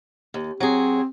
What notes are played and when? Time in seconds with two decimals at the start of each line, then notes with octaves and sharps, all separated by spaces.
0.34 D#2
0.60 F#3 C4 G#4